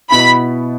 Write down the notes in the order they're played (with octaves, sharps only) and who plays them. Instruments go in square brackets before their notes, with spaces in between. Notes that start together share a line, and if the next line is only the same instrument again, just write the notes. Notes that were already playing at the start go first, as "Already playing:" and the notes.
[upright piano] B2 B3 E4 [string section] B5